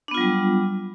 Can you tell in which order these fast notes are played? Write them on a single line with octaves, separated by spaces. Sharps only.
D4 B3 F4 F#3 G3